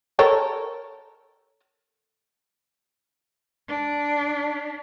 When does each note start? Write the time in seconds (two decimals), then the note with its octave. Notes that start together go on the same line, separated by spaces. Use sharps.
0.19 A4 A#4 C#5
3.68 D4